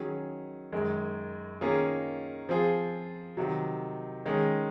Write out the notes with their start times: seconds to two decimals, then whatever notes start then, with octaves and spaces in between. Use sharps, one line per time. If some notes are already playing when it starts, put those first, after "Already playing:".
Already playing: D#3 F#3 C#4 G#4
0.73 F#2 D#3 G#3
1.61 D#3 A#3 C#4 F4 G#4
2.49 F3 C4 F4 G#4
3.37 C3 D#3 F#3
4.26 D#3 G#3 C#4 G#4